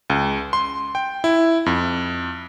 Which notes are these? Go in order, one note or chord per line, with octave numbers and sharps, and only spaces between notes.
C#2
C6
G5
E4
F2